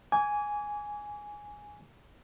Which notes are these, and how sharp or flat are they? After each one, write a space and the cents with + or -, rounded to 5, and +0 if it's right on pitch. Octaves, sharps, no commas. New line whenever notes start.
G#5 +0 D6 -40